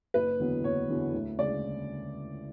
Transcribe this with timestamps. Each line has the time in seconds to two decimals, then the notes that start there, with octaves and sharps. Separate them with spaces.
0.14 F#1 B4
0.39 E2 D3 F#3 B3
0.64 F#1 C#5
0.89 E2 D3 F#3 B3
1.14 D2
1.38 C#3 G#3 D5